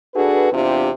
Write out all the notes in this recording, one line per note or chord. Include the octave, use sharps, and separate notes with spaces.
D4 F#4 G#4 A4 B4
E2 C3 C4 D4 F4 G4